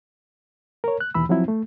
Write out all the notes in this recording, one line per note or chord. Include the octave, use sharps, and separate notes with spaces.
A#4 C#5
F#6
D#2 B2 E3 B5 E6
F3 F#3 C4 E4
A3